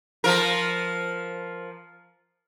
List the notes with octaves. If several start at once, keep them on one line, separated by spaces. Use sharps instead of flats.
F3 A#4